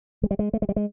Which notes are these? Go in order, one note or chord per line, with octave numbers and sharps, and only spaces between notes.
G#3
G3
G#3
A3
G#3
G3
G#3